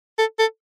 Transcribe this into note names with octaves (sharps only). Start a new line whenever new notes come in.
A4
A4